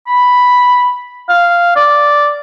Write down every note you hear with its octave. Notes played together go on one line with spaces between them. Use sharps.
B5
F5
D5